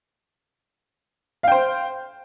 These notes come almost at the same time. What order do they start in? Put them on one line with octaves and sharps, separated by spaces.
F5 G5 C5